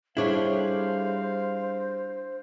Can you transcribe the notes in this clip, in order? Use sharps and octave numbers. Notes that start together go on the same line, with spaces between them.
G3 D4 E4 G#4 A4 C5 C#5 F5